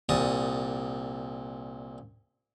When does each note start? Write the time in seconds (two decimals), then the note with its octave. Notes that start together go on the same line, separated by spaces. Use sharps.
0.09 C2 A#2 A5 D#6